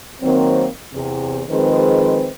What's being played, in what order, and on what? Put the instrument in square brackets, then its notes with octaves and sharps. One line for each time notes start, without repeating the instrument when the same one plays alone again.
[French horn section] D#3 F#3 A#3 C4
E2 C3
D#3 F3 G#3 C4 G#4 B4